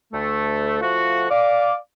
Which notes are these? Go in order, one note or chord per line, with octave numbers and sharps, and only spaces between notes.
D2 A3
F3 A3 F4 F#4
D5 F5 D6